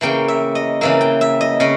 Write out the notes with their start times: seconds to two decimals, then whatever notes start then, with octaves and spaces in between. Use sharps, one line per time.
0.01 C#3 E3 A#3 G5
0.28 E5
0.55 D#5
0.81 C#3 E3 A#3 E5
1.01 G5
1.21 E5
1.41 D#5
1.60 C#3 D#5